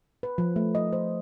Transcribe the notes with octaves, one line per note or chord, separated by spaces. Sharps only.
B4
F3
A3
D#5
C5